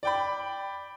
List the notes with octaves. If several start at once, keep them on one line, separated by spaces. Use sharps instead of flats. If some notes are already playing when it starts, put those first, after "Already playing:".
D5 G5 B5